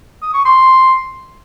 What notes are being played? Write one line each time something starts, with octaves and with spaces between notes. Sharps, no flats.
D#6
C#6
C6